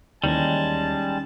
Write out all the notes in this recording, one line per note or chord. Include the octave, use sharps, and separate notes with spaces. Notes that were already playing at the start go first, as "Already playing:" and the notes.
D#2 D#3 E3 G3 G#3 C#4 A5